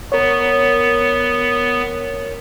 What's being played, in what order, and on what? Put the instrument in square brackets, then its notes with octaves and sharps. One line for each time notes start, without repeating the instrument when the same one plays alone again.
[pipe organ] B3 [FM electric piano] A#4 C#5